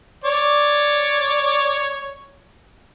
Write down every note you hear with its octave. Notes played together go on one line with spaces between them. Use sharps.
C#5 D5